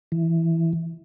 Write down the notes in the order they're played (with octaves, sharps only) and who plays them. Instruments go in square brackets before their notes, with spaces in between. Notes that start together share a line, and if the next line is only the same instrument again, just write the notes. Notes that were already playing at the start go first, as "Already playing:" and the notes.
[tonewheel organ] E3